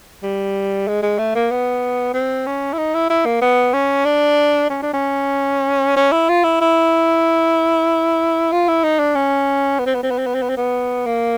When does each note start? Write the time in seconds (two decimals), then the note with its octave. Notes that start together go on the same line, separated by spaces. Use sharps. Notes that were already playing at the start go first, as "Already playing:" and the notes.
0.23 G3
0.88 G#3
1.03 G#3
1.19 A3
1.35 A#3
1.51 B3
2.14 C4
2.47 C#4
2.73 E4
2.78 D#4
2.94 E4
3.10 E4
3.26 A#3
3.42 B3
3.73 C#4
4.05 D4
4.70 C#4
4.83 D4
4.94 C#4
5.97 C#4
6.12 E4
6.29 F4
6.44 E4
6.61 E4
8.52 F4
8.68 E4
8.84 D#4
9.00 D4
9.15 C#4
9.79 B3
9.86 C4
9.95 B3
10.03 C4
10.11 B3
10.19 C4
10.27 B3
10.35 C4
10.42 B3
10.49 C4
10.57 B3
11.06 A#3